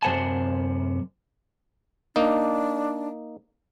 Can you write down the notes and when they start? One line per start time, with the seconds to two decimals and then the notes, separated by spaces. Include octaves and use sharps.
0.03 F#2 C3 C5 F#5 G#5 A5
2.16 A#3 D4 D#4